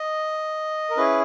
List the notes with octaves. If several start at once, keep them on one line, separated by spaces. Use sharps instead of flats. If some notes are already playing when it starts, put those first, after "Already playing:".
Already playing: D#5
A#4
C#4 E4 G#4 B4